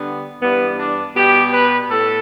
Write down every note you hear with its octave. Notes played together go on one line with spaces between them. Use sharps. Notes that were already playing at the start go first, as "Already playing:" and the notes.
Already playing: D3 G3 B3
G2 E3 G3 B3
D4
B2 G3 B3 G4
B4
A2 A4